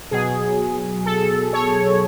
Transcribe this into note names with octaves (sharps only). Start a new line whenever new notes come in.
B2 F#3 G#4
A4
C#5